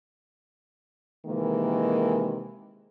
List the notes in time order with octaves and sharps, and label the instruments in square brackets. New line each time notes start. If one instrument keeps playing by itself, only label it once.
[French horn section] C3 D#3 E3 G#3 A#3